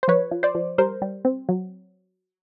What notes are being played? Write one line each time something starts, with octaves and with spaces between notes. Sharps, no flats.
C5
F3 B4 C#5
F3
C5 D5
F3
G3 A#4 C5
G3
C4
F#3